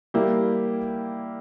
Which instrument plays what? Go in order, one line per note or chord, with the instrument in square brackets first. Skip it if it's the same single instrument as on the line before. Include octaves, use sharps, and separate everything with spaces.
[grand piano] G3 A#3 E4 G4